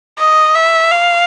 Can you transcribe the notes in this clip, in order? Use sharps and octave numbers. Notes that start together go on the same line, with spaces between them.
D#5
E5
F5